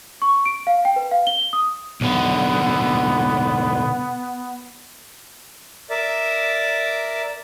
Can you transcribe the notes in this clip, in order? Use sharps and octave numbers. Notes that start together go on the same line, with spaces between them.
C#6
D7
F5
G5
B4
F5
G7
D#6
B1 D3 B3
A#4 D5 E5